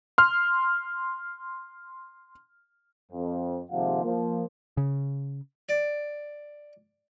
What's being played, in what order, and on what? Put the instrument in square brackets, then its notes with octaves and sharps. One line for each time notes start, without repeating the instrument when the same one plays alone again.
[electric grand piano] C6 F6
[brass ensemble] F2
D#2 C3 F3 G#3 F5 F#5
F3 A#3
[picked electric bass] C#3
[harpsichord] D5